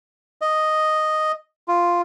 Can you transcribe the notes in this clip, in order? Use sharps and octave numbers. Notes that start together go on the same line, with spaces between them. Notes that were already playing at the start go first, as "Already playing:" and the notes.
D#5
F4